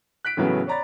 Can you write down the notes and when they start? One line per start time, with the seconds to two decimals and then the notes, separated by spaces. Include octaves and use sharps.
0.25 F#6 B6 D7
0.37 A2 C#3 E3 F#3 B3
0.67 C#5 D5 A#5 B5 A6